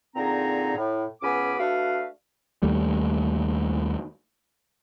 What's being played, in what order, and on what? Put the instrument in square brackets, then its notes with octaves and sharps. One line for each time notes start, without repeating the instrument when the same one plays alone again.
[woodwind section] A#2 D3 C4 D#4 G#4 A#5
A2
C#2 B3 C#4 G#5 B5 D6
A3 D4 F#4 B4 F5
[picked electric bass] D#2 G3 A3